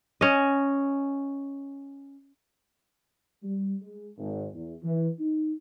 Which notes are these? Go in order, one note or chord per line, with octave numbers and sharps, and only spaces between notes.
C#4 D#5
G3
G#3
G#1
E2
E3
D#4